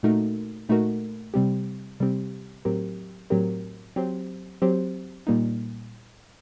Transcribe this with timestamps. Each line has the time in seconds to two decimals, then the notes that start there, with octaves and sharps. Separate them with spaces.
0.03 A#2 A3 D#4 F#4 A#4
0.69 A#2 A3 D#4 F#4 A#4
1.34 C3 G3 C4 G4
2.00 C3 G3 C4 G4
2.65 A2 F#3 C4 G4 A#4
3.30 A2 F#3 C4 G4 A#4
3.96 F#3 C4 G4 C5
4.62 F#3 C4 G4 C5
5.27 A#2 G3 A#3 D#4